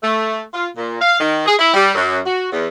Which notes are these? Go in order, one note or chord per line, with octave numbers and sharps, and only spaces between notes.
A3
F4
A#2
F5
D#3
G#4
E4
G3
F#2
F#4
E2